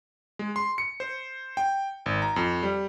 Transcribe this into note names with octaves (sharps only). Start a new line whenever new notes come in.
G#3
C6
C#7
C5
G5
G#1
A#5
F2
G3